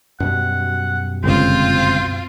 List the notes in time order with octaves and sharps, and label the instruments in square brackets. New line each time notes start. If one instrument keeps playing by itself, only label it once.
[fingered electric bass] F#2 B2 G3 [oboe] F#5
[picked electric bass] G1 C#2 [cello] C4 F4 [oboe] C5